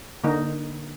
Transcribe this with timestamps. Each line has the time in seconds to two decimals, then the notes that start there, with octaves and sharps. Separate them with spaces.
0.24 D3 A#3 D#4